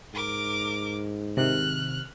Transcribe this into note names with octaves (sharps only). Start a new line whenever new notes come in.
G#2 A#4 D6
C3 D#3 F6 F#6